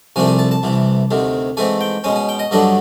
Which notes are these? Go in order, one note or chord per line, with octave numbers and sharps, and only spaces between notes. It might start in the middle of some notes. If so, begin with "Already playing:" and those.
C2 C3 F3 A3 D4 G#5
G#5
A5
A5
C2 C3 E3
D2 C3 D#3
G#2 E3 A3 C4 G#5
G5
B2 G#3 C#4 G#5
G#5
G5
D#5
G2 D3 F#3 A3 D4 D#5